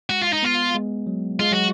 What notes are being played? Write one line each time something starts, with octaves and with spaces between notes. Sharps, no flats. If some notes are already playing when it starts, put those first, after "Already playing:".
G#3 F#4
F4
D#4
B3 F4
G#3
F#3
G#3 F4
F#3 F#4